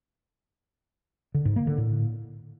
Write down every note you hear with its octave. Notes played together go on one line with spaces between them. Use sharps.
D3
G#2
A#3
D3
A2